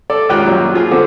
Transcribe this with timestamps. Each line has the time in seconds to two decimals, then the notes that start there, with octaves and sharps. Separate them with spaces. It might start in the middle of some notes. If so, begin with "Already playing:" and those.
0.10 A4 D5
0.29 C#2 D#3 F4 G4 G5 F#6
0.45 F#2 A#2 F#3 G3
0.74 F3 F4 G#4
0.91 D3 F3 C4